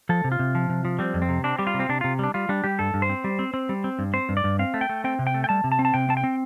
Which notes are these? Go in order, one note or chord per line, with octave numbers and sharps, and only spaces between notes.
F3 A4
C3
F4
C3
F3
C3
F3
G3 C4
F2
C4
C3
C4 D4
G3 G4
F4
C3
C4
C3 D4
C3 F4
G3 D4
G3 F4
G3 D4
G3 G4
G2 A4
G2
C5
C4
G3
C4
C4
G3
C4
G2
C4 C5
G2
D5
G2
C4 F5
A3
G5
A3
C4 G5
C3
G5
A3
G5
G3 A5
C3
A5
C4
A5
C3 G5
C4 A5
G5
C4